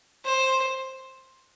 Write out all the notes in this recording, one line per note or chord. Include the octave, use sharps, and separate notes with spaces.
C5